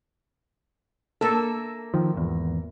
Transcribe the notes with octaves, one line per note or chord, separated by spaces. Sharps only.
A#3 A4 E5
D#3 F3
G#1 E2